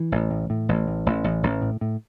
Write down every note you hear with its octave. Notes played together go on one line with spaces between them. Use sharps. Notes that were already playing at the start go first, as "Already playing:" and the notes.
Already playing: E3
A1
A2
A2
A1
A2
A1
A1
A1
A2
A2